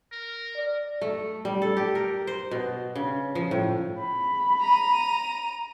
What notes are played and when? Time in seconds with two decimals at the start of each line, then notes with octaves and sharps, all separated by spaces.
0.12 A#4
0.56 D5
1.02 A3
1.45 G3
1.62 A4
1.77 G4
1.95 A#4
2.27 C5
2.51 B2
2.96 C#3
3.35 F3
3.51 A2
4.00 B5
4.61 A#5 D#7